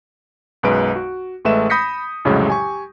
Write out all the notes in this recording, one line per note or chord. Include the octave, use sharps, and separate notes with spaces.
B1 F#2 G#3 B4 D7
F#4
A1 G#3 A3 B4 E5 E7
B5 D#6 G6 A#6 B6 C#7
C2 F2 A2 C#3 F#3 G#3
G4 G#5 C#6